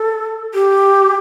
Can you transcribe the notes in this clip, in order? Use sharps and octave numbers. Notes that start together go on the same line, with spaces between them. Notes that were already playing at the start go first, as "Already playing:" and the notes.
Already playing: A4
G4